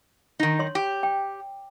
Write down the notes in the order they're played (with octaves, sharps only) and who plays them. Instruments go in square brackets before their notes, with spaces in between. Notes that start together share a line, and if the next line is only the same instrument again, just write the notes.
[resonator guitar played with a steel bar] D#3 D#4
[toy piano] C#5 C6
[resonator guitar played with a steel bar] G4
[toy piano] G5